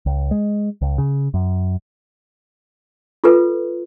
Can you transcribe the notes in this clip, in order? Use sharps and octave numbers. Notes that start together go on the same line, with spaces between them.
C#2
G#3
C#2
C#3
F#2
F4 A4 B4